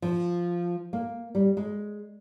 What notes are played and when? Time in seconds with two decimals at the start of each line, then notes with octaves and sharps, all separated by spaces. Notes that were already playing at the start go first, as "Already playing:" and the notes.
0.02 F3
0.93 A#3
1.35 G3
1.57 G#3